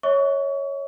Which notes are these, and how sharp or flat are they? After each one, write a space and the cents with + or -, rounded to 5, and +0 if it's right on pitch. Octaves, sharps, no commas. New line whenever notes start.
C#5 +0 E5 -45 C#6 +30